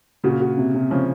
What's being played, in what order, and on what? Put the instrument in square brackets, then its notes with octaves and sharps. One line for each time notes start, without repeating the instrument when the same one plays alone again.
[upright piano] A#2 C#3 [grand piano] F#4
[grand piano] F#4
C3
C3
[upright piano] C#3 F3 [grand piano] C#4